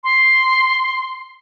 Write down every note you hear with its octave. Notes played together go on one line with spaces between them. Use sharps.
C6